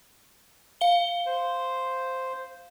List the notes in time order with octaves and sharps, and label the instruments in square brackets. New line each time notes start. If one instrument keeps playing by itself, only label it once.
[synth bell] F5 G7
[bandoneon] C5